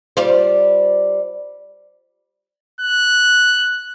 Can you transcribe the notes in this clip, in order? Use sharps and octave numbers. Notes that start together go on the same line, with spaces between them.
G3 F4 C5
F#6